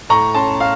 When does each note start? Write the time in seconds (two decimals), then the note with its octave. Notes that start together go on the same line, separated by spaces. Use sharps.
0.09 A2 A#5 C#6
0.34 C#4 A5 C6
0.60 F5